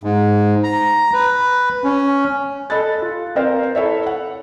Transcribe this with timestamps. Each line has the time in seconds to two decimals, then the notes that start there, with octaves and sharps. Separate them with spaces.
0.03 G#2
0.64 A#5
1.13 B4
1.84 C#4
2.70 A4 D#5 B5 F#6 A6
3.02 F4
3.35 C4 A#4 C5 F5
3.75 E4 A4 C#5 E5
4.07 F#5